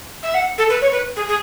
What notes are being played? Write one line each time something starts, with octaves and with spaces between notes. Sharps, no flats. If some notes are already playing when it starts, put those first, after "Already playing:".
E5
F#5
A4
B4
C#5
B4
G#4
G#4